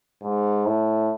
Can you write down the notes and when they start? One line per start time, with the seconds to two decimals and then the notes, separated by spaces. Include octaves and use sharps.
0.23 G#2
0.66 A2